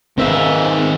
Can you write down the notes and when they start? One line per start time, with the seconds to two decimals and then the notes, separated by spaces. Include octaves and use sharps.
0.18 G#2 D#3 C4 B4 E5 F5